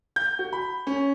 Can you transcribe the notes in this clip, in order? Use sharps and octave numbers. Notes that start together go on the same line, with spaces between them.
G6
F#4
B5
C#4